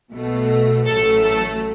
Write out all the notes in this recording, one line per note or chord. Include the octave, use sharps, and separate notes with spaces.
B1 B2 A3
A1 A2 F#3 A3 A4
A4